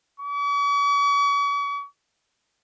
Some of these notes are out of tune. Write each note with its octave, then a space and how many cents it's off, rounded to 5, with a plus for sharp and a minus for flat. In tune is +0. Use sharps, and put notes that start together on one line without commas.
C#6 +45